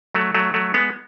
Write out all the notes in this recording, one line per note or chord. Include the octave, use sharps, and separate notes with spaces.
F#3 A3
F#3 A3
F#3 A3
G#3 B3